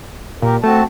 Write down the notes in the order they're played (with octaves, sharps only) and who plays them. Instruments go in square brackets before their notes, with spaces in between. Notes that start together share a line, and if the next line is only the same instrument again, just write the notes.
[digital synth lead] A#2 [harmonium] G4 A#4
[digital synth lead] A3 [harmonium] C4 F#4 A5